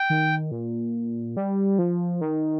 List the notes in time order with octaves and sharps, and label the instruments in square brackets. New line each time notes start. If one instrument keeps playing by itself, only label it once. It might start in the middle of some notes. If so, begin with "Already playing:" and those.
Already playing: [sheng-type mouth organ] G5
[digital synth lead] D#3
A#2
G3
F3
D#3